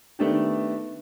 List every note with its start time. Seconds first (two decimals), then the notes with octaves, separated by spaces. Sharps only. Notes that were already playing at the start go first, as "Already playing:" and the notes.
0.19 D#3 A3 B3 D4 G4